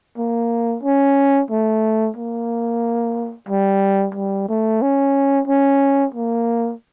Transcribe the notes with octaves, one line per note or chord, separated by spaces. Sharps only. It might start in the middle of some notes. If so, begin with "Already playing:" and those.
A#3
C#4
A3
A#3
G3
G3
A3
C#4
C#4
A#3